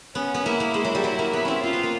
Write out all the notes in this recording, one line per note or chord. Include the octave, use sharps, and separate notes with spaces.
B3 C#4
B3
A#3 E4
A#3
G#3
F#3
G3
F#3 E4
A#3
B3 E4
C4 C#4
C4 F4
B3
A#3